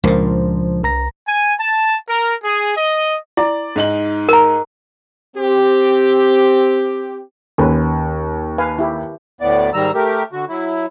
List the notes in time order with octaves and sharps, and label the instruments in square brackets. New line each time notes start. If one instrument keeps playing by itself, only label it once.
[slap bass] C#2 A#2 [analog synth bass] F3 [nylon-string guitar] D4 A#4 C5
[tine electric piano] C2 A#5 A#6
[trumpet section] G#5
A5
A#4
G#4
D#5
[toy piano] E4 [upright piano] D5
[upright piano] G#2 D#4 F#7
[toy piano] A#4 A#5
[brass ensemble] C4 G4
[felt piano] D#2 [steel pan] C#4 B4
[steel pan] B4 F5 G#5
E4 G4
[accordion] D2 A2 B3 D5
G#2 D#3 G3 A#5 E6
A3 G4 A#4
D3 F#4
F#3 E4